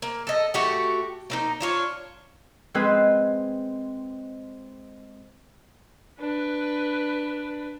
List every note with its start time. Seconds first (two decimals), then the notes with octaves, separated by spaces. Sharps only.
0.02 A#3
0.27 A4 D#5
0.54 A3 F#4 G4 F#5
1.30 A#3 C4 D#4
1.60 D4 F4 C#5
2.74 G#3 C4 B4
6.20 D4 B4